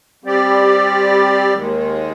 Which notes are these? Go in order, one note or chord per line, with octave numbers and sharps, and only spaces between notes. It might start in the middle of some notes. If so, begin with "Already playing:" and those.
G3 C4 G4 D5
D#2 D#3 G#3